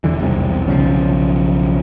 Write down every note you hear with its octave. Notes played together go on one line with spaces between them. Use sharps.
E1 F2 D3 E3
B1 E2 C3 G3
B1 C#3 E3 F3